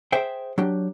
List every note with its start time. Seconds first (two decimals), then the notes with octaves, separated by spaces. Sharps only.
0.12 G#4 C5 E5 G5
0.58 F#3 D4 G4